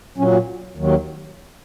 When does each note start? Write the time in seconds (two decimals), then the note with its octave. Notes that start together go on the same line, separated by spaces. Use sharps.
0.17 A#2 F#3 C#4
0.32 F#4
0.75 D#2 D#3 F#3